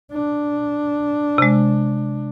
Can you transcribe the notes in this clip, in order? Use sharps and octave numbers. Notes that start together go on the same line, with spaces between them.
D4
C3 G#3